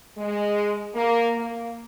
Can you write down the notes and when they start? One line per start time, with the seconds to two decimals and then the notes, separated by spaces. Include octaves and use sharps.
0.18 G#3
0.95 A#3
1.37 A#3